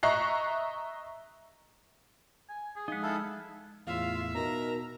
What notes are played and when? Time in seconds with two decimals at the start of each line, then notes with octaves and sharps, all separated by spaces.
0.03 D#5 E5 A#5 C#6 F#6 C7
2.49 G#5
2.76 G#4
2.88 F3 G#3 D#4 F#5
3.03 E4 A4 F5
3.87 E2 A2 F4 E5 F5
4.35 B2 D#4 A#4 A#5